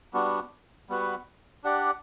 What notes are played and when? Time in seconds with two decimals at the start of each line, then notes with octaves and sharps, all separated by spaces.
0.13 G3 B3 D4 F#4
0.89 G3 B3 F#4 B4
1.64 D4 G4 D5 F#5